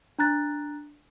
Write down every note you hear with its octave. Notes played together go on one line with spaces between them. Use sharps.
D4 A#5 F#6 A6